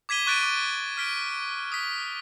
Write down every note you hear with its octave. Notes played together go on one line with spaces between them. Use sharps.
D6 G#6 B6 D#7 G7
C#6 F#6 A6 D7 D#7
C#6 D6
F6 B6 D7
D#6 B6